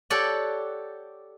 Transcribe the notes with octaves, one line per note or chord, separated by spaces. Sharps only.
G4 A4 C#5 D5 F#5